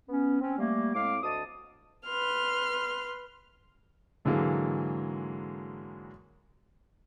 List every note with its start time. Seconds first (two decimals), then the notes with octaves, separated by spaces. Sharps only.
0.09 B3 C#4
0.41 C4 C#4
0.58 G3 A3 A#3
0.94 A2 G#3 C4 F5 D6
1.23 D2 D#5 A5 D#6
2.05 B4 C6 F6
4.25 G#2 D3 E3 F#3 G#3 A#3